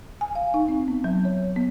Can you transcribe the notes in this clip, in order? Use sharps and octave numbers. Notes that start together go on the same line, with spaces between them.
G#5
F5
D#4
C4
B3
F#3
C#5
B3